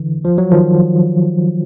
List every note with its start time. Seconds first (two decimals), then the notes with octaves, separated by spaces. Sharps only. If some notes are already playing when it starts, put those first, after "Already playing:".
Already playing: D3 E3
0.25 F3
0.38 F#3
0.51 D#3 F3